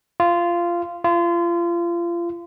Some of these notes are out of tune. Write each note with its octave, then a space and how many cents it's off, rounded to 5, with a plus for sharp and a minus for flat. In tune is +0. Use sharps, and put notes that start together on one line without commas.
F4 -15
F4 -30